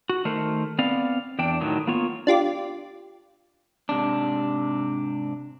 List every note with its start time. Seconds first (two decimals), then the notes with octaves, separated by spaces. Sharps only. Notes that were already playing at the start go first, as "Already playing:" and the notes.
0.09 F#4
0.25 D#3 A3 A#4 C5
0.79 B3 C4 D5 F5
1.39 E2 D4 G5
1.61 A2 D#3 F#3
1.87 A#3 B3 F4 C#5
2.27 D4 F4 G4 D5
3.89 G#2 C3 D4